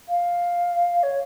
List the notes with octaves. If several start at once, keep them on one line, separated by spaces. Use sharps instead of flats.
F5
C#5